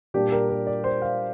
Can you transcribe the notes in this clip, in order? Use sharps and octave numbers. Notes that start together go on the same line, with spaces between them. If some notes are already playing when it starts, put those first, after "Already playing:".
A#2 G3 A#3 D4 G4
A#4
A#4
D5
C5
F5